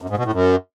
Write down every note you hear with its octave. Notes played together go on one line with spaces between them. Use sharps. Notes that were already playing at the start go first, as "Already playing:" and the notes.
F#2
G#2
B2
A2
F#2